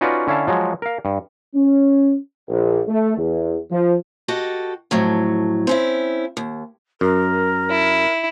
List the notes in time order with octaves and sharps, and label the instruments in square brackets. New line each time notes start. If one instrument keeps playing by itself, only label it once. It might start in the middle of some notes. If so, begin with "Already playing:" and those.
[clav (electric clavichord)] C#4 D#4 F4 F#4 B4 D5
D3 C#4 E4 F5 A5
F3 F#3 G#3
A#4 F5
G2
[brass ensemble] C#4
A#1
A3
E2
F3
[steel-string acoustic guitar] F#4 G4 A4 D#5
F2 A2 F#3
C4 C#4 E4
D#2
[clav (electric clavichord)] F#2 [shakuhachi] A#4
[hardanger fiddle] E4